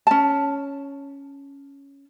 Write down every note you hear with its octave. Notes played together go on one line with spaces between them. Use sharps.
C#4 A5